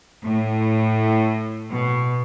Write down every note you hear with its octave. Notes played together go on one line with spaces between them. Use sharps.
A2
B2